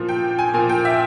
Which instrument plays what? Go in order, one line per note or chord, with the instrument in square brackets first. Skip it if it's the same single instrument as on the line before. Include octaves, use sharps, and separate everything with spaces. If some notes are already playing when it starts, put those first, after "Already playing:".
Already playing: [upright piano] A#2 F3
G5
G#5
A#2 F3 G#5
G5
E5